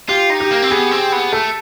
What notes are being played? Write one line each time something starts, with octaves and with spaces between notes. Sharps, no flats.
F4 G4
D#4
G4
A#3
C4
B3 G#4
C4
B3
A3 A4